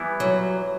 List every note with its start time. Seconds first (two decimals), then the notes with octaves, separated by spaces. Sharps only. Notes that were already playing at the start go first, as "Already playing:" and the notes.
Already playing: E3 G3 B3 E4
0.20 F#3